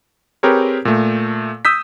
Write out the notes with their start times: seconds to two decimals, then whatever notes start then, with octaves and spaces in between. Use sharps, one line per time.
0.43 C4 G4 G#4 A#4 B4 C#5
0.85 A#2 A3
1.65 D#6 E6 G6 B6